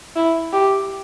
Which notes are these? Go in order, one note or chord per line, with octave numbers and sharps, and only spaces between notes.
E4
G4